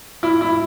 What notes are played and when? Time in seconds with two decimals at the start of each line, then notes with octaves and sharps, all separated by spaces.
0.23 E4
0.41 E4